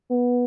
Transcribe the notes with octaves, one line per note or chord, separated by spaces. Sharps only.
B3